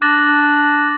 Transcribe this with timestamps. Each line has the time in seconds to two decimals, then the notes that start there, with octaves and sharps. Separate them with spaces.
0.02 D4 D6 F#6 A6 A#6